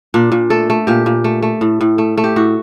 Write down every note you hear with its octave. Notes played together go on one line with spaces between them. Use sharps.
A#2 D4
A#2
A3 A4
A3
A#2 G4
A#2
A3
A3
A2
A2
A3
A3
G4
A2 F#4